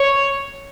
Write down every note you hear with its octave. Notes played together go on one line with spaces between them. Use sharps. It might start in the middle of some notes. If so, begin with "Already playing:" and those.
Already playing: C#5